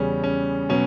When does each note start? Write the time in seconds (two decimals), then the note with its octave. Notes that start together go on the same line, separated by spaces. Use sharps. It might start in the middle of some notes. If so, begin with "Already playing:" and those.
Already playing: E2 C#3 G3 C#4
0.24 C#4
0.69 B2 F#3 C#4